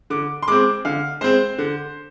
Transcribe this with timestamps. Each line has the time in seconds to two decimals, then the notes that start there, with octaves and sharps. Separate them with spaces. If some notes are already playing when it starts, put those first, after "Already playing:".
0.10 D3 D6
0.43 C6
0.48 G#3 C4 D6
0.85 D3 F5
1.21 G#3 C4 C5
1.58 D3